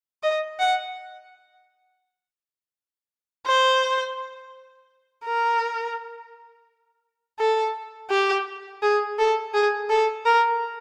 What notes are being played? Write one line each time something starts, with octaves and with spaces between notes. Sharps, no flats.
D#5
F#5
C5
A#4
A4
G4
G#4
A4
G#4
A4
A#4